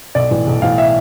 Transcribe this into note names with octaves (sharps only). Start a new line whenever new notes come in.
B1 D5
A2 E3
B1
A2 E3 F5
E5